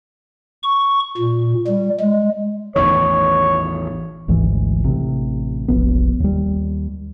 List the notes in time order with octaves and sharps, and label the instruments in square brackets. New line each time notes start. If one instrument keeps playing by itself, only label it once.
[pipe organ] C#6
A#2
G3
G#3
[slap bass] A1 E2 D#3 [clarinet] C#5
[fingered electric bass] G#1 D2 G#2 E3
A1 C3
E1 A#1 B3
D#2 G3